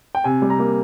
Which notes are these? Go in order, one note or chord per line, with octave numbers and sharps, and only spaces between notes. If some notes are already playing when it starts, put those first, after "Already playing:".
G5
C3 G#5
G3
A#5
A#3